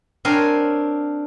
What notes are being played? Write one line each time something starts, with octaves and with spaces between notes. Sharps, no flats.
C4 D4 A#4 C#5 F5 G#5